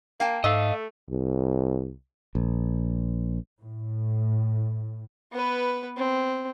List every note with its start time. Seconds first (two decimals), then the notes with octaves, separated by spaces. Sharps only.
0.20 A#3 F5 G5 A5
0.44 G#2 A3 A4 D#5 F5
1.10 C2
2.35 A#1
3.62 A2
5.32 B3 B4
5.97 C4